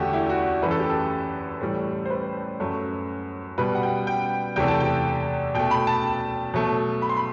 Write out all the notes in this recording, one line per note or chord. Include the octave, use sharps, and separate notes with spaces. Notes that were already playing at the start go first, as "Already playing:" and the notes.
Already playing: E2 D3 A3 F#4 G4
E4
F#4
F#2 E3 A3 B4
A4
G4
A4
A2 E3 G3
C5
B4
F#2 F#3 A3
B2 G3 B4
F#5
G5
G5
E2 C3 E3 A3 G5
A5
G5
B2 A3 G5
B5
A5
B2 F#3 A3
B5
C6
B5